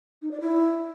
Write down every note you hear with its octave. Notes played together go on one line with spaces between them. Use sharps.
D#4
D5
E4